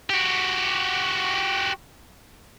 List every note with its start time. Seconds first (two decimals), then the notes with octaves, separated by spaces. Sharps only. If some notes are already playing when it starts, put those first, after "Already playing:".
0.10 F#4 G4